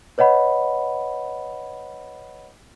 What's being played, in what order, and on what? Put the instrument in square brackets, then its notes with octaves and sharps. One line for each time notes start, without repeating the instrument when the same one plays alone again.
[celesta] B4 C#5 D#5 F#5 B5